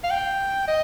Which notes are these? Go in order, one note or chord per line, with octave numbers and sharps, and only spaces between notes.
F5
G5
D#5